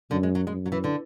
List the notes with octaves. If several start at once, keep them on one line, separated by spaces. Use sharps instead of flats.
F#2 D3
G#3
F#3
F#2 G#3
F#3
E3
D3